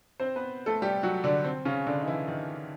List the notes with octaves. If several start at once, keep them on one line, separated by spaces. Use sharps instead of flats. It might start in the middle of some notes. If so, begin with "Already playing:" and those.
C4 C5
B3 B4
A3 A4
G3 G4
F#3 F#4
D3 D4
C4
C#3 C#4
D3 D4
D#4
E3 E4
D#3 D#4